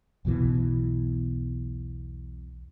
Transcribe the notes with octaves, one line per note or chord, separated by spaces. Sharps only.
B1 E2 B2 E3